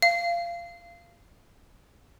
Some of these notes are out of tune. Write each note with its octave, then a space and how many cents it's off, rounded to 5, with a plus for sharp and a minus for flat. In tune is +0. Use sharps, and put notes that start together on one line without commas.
F5 -20